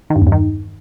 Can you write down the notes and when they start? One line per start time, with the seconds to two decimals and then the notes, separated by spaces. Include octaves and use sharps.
0.10 D#3
0.16 G2
0.21 E2
0.27 G2
0.32 D#3